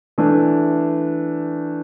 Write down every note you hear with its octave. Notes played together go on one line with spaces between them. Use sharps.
E3 A3 D4